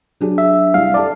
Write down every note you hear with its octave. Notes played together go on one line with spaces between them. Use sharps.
F#3 D4 G#4
E5
C2 E4 E5 F5
A4 D5 A5 D6